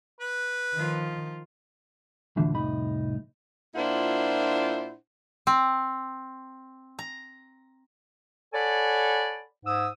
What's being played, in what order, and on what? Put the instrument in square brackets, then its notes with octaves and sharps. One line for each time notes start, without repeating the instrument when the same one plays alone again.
[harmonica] B4
[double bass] D#3 [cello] F3 F4
[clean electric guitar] D2 A2 D3 E3 F3
C2 F2 A2 D#4 B5
[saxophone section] A#2 D4 E4 F4 C5 F#5
[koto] C4
A#5
[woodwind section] A4 C#5 D5 F#5 G#5 B5
G#2 D#6 E6